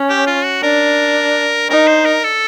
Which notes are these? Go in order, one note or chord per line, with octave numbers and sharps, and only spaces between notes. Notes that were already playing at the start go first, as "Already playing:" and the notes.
Already playing: C#4
G4
F4
F#4
D4 A#4
D#4 A#4
C5
A#4
A4